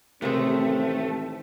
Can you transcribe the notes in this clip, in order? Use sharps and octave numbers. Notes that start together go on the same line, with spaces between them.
A1 C3 D#3 G#3 A3 C4